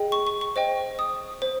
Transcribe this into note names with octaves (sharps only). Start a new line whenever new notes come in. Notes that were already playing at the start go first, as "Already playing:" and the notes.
Already playing: G#4 D#5 G5
C#6
C#6
C#6
C5 D#5 G5
D#6
C5